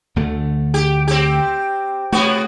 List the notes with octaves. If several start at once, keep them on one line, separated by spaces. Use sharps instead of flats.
D2 D3 A3
G4
C4 G4
C3 A3 B3 F#4